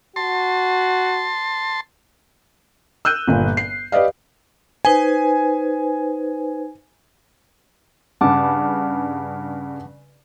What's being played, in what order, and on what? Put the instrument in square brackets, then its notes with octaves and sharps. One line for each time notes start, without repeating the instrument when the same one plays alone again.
[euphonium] F#4 [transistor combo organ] A5 C6
[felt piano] E6 F#6 G6 D#7
G1 A#2
C7
G4 B4 D5 D#5 F5
[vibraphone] D#4 B4 C5 [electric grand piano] G#5
[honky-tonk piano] G2 C#3 [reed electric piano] F#5 A5 D6